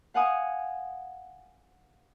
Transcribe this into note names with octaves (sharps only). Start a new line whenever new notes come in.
F5 F#5 G#5 D#6